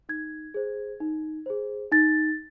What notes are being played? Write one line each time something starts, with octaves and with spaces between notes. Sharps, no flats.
D#4 G#6
G#4 C5
D#4
G#4 C5
D#4 A6